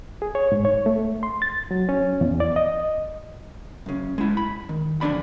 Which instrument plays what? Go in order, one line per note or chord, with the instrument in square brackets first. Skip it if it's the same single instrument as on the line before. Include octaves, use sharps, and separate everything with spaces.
[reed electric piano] G#4
C#5
G#2
C#5
A3
C6
A6
F#3
C#4
E2
D5
D#5
[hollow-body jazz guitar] F#2 C#3
G#3 E4
B5
D#3
B1 F2 D3 D4 D5 B5